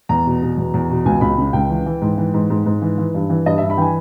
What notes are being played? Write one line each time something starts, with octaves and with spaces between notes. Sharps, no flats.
E2 A#5
B2
B2
E2
E2
B2
C#2 G#5
C#2 B5
C#3
C#2 G5
E3
E3
G#2
E3
G#2
G#2
G#2
E3
E3
G2
E3
G2 D#5
G2 E5
B5
E3 G5 G#5